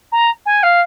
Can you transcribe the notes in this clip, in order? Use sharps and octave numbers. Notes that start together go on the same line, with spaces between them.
A#5
G#5
F5